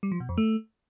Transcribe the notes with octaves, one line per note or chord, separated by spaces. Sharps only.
G3
F3
B2
F2
A3